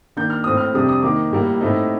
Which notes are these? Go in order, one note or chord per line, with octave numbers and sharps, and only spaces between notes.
D#3 A#3 D4 G6
F6
A2 A3 C4 D#6
F6
F2 C3 G3 D4 D#6
D#6
D#3 A#3 D#4 D6
A2 G3 A#3
A2 A3 C4 D#4